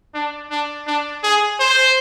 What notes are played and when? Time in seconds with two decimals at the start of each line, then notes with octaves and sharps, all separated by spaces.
0.15 D4
0.51 D4
0.87 D4
1.24 G#4
1.60 C5